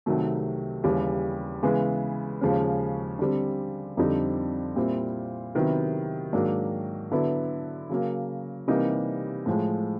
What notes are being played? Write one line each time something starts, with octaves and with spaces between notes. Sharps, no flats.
C2 C3 D#3 F#3 A3
D#2 C#3 E3 G3
C#3 E3 G#3 B3
D#2 C#3 F3 G#3 C#4
D3 G3 C4
F2 D3 G3 C4 D#4
A#2 G3 C4 E4
C3 D#3 F#3 B3 E4
G#2 D#3 F#3 A#3 D4
D3 F#3 B3 E4
C#3 F#3 A#3
C3 E3 G3 A#3 D#4
A2 F3 G#3